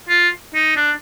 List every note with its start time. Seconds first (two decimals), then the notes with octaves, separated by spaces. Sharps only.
0.09 F4
0.54 D#4
0.77 D4